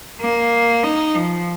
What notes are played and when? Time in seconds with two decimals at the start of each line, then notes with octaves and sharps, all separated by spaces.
0.21 A#3
0.84 D#4
1.15 F3